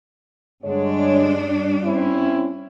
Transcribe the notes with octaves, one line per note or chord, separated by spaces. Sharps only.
G2 D3 G#3 D4 C#5
C4 C#4 E4